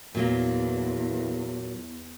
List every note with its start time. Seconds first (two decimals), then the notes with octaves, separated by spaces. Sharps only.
0.15 E2 A#2 F#3 A#3